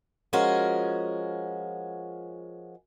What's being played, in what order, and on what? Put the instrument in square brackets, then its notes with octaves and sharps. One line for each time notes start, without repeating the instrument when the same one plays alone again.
[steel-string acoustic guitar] F3 G#3 C#4 F#4 A#4